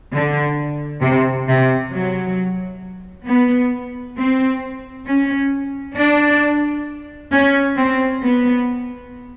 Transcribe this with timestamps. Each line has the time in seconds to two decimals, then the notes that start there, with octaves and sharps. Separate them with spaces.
0.12 D3
1.02 C3
1.47 C3
1.92 F#3
3.27 B3
4.17 C4
5.06 C#4
5.96 D4
7.31 C#4
7.76 C4
8.22 B3